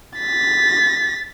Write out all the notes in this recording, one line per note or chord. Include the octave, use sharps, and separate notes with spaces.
A6 B6